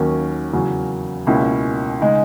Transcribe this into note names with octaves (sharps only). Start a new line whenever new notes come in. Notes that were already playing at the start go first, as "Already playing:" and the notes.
Already playing: D#2 D#3 F#3 A#3 C#4
E2 C#3 F#3
C#2 B2 A#3 C#4 E4
C#3 G#3 D#4